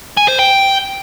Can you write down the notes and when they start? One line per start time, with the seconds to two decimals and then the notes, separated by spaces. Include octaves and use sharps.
0.17 G#5
0.28 C5
0.39 G5